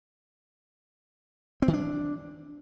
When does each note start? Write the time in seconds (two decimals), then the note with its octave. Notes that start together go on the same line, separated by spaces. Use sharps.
1.62 C4
1.68 D#3
1.73 D4